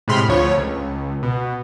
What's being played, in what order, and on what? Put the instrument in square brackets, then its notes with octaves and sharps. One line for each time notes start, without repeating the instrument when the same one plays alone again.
[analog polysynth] A2 C3 G#3 B5 C6 F6
D2 F3 C#5
C#2
B2